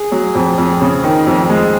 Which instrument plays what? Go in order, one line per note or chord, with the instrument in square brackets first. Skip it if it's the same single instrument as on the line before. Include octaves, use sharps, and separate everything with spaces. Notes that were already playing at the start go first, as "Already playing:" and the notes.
Already playing: [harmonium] G#4
[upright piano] F#3
F2
F2
C#3
D#3
F2
G#3